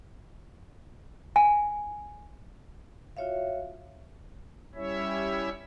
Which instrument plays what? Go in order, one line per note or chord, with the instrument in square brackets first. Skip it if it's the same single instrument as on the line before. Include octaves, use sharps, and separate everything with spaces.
[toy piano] G#5
[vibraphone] F4 F#4 C#5 E5 F5
[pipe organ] G3 C#4 E4 C#5 E5